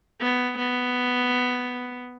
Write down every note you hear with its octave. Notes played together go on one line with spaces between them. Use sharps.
B3
B3